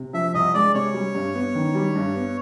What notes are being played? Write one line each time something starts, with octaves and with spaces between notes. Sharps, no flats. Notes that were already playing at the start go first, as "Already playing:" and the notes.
Already playing: C3
F3 E5
C2 D#5
G#3 D5
C3 C#5
G3
G2
B3
D#3
G3
G2
B3